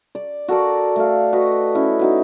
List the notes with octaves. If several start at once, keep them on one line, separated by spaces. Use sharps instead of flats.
D5
F#4 A4 A#4 D5
A3 F5
F#4 B4 D#5
C#4 E4
D#4 F#4 B4